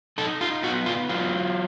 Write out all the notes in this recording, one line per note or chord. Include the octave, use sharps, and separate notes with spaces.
D#4 A4
F4
B3 F#4
F4
F#3 F4